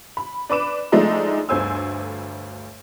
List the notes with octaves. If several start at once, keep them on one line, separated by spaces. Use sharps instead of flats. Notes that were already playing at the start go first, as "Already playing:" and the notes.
B5
D4 B4 D6 E7
F3 G#3 A3 D4 D#4 F4
G1 D2 A3 C5 G#5 E6